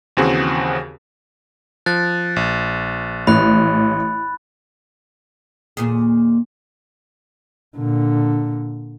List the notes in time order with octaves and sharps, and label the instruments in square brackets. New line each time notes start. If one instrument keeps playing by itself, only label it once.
[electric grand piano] D#2 C#3 E3 C4 F#4 G#4
[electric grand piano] F3 [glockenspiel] F#6 A6
[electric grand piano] A#1
[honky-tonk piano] A1 [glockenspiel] B5 F#6
[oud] D#2 A#2 G#4
[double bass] A#2 D3